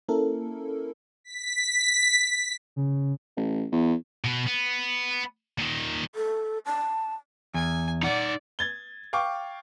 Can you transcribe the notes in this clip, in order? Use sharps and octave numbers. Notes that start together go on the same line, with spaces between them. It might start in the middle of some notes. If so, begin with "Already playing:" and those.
A#3 C#4 E4 A4 A#4
B6
C#3
A1
E2
B2 B3
B3
A#2 D#3
A4
A5
E2 G#5
D#4 D5 F#5
G#6 A6 G7
F5 G5 C#6 D6